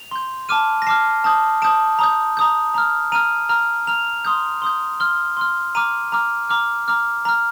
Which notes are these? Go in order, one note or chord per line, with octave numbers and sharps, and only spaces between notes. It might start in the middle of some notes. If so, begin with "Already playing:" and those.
Already playing: F7
C6 G6
A5 D6 F6 D#7
A#6
A5 D6 F6 C7
A5 D#6 G6
A5 D#6 G6 D7
A#5 D#6 G6
A#5 D#6 G6
A#5 F6
A#5 F6 D#7
A#5 F6
A#5 F6 F7
C6 D#6 G6
C6 D#6 G6
C6 F6 G7
C6 F6
A#5 D6 F6 D#7
A#5 D6 F6
A#5 D6 F6
A#5 D6 F6
A#5 F6